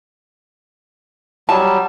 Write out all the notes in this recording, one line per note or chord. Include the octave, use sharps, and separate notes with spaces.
F#3 G3 A5